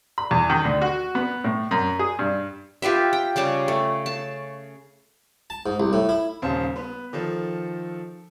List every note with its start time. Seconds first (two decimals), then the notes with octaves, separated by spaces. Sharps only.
0.18 B5
0.31 E2
0.50 D#3
0.65 D2
0.82 F#4
1.15 B3
1.44 A2
1.71 F#2
1.99 G#4
2.19 G2
2.82 F4 G4 B4 E5
3.13 G5
3.36 C#3 G3 A5 D6
3.68 A3
4.06 A5
5.50 A5
5.66 G#2
5.80 C2
5.93 A2
6.09 E4
6.42 D#1 C#3 C5 F5 A5
6.76 B3
7.13 D#3 F3 A4